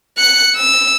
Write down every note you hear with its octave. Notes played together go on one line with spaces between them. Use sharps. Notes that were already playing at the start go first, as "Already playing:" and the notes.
F#6 C#7
E6